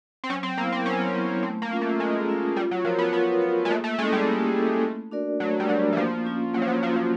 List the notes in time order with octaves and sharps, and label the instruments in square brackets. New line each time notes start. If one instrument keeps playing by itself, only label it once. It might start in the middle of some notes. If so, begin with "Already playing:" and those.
[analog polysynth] C4
[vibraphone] F#3 [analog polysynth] C#4
[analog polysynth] C4
[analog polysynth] A#3 [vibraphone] B3 E4
[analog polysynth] C4
[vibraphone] F#3 [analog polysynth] C#4
[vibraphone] B3 E4
[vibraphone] A3 [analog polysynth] C4
[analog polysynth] A#3
[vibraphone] C#4 F4
[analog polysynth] A3
[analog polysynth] G#3 [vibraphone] A3
[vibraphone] C#4 F4
[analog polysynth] G3 [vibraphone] F4
[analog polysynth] F#3
[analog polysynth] F3 [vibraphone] A#4 C#5
[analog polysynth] B3
[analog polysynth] B3 [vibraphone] F4
[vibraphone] A#4 C#5
[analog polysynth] G#3
[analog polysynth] A3 [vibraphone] A#3
[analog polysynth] A3
[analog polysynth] G#3 [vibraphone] C#4 E4 A4
[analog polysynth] G3
[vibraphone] A#3
C#4 E4 A4
A3
D4 F#4 A#4 D5
[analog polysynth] F#3 [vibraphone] A3
[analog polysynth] G3
[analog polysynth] F#3 [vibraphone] D4 F#4 A#4 D5
[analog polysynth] E3
[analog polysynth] F3 [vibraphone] A#3
[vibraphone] C#4 F4
[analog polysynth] F#3 [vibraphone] A#3
[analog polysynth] F3
F#3
[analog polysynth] F3 [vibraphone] C#4 F4
[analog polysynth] F3